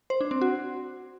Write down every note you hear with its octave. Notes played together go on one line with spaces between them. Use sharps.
C5
D4
C4
F#4